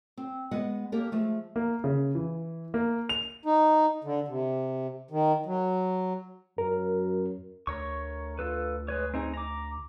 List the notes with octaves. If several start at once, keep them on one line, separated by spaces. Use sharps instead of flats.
C4
G#3 B3 D#5 F#5
A#3 G4 A4 A#4
F3 G#3 A3
A#3
C#3
E3
A#3
F7
D#4
D3
C3
D#3
F#3
F#2 A#4
D2 A#4 C#5 C#6
F4 A4 B4
G#3 B4 C#5
C4 D#4 G#4
A#5 D6